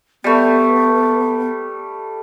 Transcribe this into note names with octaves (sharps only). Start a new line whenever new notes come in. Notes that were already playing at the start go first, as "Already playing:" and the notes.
G3 A3 B3